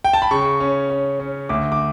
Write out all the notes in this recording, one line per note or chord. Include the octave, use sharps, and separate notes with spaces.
G5
A5
B5
C#3 C#6
C#4
C#4
C#4
D2 D6
D6